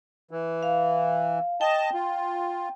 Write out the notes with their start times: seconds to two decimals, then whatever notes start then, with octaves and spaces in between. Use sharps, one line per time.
0.31 E3
0.63 F5
1.61 D#5 G5 A5
1.94 F4